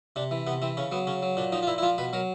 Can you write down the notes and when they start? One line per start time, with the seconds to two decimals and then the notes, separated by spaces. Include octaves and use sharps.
0.16 C3 D4
0.31 E3
0.47 C3 B3
0.62 E3 C4
0.77 C#3 C#4
0.92 F#3 B3
1.07 C#3 C#4
1.22 F#3
1.37 A#2 D4
1.52 F3 D#4
1.63 F4
1.67 A#2 E4
1.78 E4
1.82 F3 F4
1.98 B2 B4
2.13 F#3 A#4